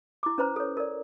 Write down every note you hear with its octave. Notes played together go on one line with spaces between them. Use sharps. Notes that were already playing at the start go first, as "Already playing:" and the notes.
E4 D6
C#4 B4 C5 A#5
A4 C#5
A#4 D5